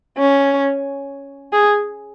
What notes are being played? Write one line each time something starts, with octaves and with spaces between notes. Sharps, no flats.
C#4
G#4